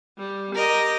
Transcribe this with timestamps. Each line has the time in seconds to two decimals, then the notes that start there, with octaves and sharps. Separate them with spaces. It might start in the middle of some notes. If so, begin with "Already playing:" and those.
0.19 G3
0.56 G4 A#4 D#5